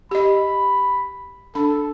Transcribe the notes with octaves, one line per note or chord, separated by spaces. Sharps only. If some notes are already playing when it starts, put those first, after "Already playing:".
G4 D#5 B5
D4 A4 B5